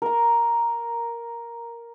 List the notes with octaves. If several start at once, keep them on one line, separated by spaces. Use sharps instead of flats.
A#4 A#5